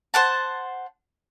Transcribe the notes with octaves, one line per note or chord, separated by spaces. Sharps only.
C5 F#5 A5